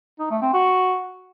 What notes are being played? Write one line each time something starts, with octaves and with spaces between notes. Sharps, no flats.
D#4
A3
C4
F#4